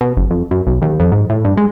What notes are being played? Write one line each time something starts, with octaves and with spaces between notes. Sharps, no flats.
B2
F#1
F2
F#2
B1
D#2
F2
G#2
A2
G2
G#3